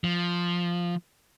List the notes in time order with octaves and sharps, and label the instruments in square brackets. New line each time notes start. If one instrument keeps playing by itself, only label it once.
[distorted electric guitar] F3